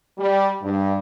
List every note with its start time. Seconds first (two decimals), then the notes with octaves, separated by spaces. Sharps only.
0.18 G3
0.62 G2